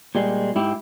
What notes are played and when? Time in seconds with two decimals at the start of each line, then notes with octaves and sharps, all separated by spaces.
0.15 A#2 G3 G#3
0.56 G#2 E4 G4